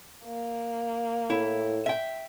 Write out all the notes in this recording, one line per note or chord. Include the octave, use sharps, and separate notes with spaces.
A#3
A2 E4
E5 G5